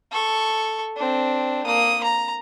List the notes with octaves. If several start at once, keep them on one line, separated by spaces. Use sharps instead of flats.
A4 C#6
C4 D4
A#3 D#6
A#5